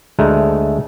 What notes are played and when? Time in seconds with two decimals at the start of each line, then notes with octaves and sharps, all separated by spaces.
0.19 D2 G#3 A3 A#5